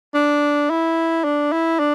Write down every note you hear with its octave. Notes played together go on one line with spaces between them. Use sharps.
D4
E4
D4
E4
D4